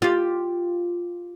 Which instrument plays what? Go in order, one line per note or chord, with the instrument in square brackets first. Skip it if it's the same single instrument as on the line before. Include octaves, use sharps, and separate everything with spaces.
[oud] F4 G4